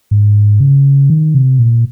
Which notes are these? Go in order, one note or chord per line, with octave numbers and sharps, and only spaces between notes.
G#2
C#3
D#3
C3
A#2